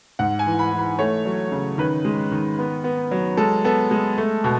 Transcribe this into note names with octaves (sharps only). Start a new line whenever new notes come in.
G#2 F#5
G#5
E3
B5
E3
B5
A3 C#5
F#3
C#3
D#3 B4
G#3
D#3
B3
B3
F#3
G#3 A4
B3 A4
G#3
A3
B2